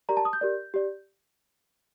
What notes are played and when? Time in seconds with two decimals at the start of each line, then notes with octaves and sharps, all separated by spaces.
0.09 G4 A#4 D5 A#5
0.17 A5
0.25 D#6
0.33 G6
0.41 G4 A#4 D5
0.74 G4 D5